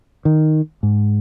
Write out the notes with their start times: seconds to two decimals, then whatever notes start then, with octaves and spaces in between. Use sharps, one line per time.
0.25 D#3
0.83 G#2